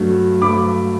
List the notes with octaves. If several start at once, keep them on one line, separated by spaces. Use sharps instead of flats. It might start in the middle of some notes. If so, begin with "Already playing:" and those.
Already playing: G2 F#3 A3
G2 F#3 A3 B5 D6